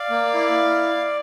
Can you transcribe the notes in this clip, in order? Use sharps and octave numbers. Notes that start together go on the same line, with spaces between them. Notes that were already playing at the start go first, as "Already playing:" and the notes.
Already playing: D5 F5
A#3
E4